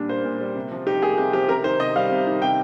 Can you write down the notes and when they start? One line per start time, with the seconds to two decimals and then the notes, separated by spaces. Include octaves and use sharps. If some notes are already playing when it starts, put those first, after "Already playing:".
Already playing: A#2 G3 D4
0.09 A#3 C5
0.25 A#2
0.40 G3
0.56 C3
0.72 F3
0.87 D#4 G4
1.02 A#3 G#4
1.18 C3 G4
1.33 F3 G4
1.49 C3 A#4
1.64 D#3 C5
1.80 C3 D#5
1.95 G3 F5
2.11 C3
2.27 D#3
2.42 C3 G5